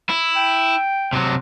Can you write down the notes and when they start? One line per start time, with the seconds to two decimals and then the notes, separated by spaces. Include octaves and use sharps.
0.10 E4
0.36 G5
1.13 C3 F#3